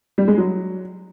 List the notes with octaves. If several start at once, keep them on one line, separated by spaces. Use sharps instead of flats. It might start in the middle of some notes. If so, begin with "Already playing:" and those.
G3
G#3
F#3